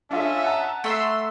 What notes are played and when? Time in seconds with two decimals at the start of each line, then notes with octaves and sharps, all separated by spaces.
0.11 C#4 D4 F4 A4 D#5 E5
0.44 F#5 A5 A#5
0.84 A3 E5 C6 E6